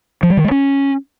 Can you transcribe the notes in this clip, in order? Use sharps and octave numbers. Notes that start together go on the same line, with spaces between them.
F3
G3
D#3
G#3
C#4